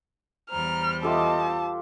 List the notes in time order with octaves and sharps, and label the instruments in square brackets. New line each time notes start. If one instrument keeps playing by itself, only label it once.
[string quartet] E2 G3 C5 [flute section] A#5 [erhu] F6
[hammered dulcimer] F4 G4 A4 [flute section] D#5 D6 D#6 [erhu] A5